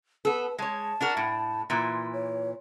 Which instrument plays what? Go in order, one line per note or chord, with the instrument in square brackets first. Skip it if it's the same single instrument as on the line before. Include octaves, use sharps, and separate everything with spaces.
[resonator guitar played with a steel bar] B3 A4 [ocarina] B4
[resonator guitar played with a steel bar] G#3 C#5 [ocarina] A5
[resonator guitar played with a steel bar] D4 F#4 A#4
A2
[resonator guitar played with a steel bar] A#2 E3 [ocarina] C6
[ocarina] C#5